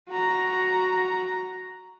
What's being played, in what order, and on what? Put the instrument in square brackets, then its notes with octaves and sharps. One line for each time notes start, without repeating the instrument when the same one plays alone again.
[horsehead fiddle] F#4 A#5